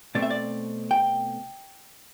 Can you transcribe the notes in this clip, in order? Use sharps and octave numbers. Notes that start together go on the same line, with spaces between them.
B2 A3 C4 D5
E5
D5
G5